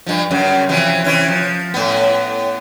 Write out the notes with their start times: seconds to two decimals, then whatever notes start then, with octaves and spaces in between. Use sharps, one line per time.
0.06 G2 F3
0.31 F#2 C#3
0.69 C3 E3 F3
1.04 C3 E3 C#4
1.28 F3
1.74 A2 B3